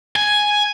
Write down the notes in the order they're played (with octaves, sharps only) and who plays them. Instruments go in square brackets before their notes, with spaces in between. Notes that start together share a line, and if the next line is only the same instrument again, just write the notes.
[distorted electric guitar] G#5